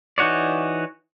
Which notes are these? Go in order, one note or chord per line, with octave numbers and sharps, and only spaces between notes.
E3 D#4 F#4 C#5 D5